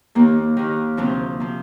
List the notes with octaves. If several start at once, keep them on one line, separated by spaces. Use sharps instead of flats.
D#2 D#3 A#3
D#2 D#3
D2 C3 F3 C4
C3 F3